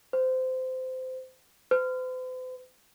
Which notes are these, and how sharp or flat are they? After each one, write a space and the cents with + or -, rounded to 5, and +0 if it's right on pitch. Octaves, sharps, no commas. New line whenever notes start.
C5 -20
C5 -45